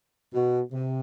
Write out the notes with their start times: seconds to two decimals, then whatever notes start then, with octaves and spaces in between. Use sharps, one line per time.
0.32 B2
0.72 C3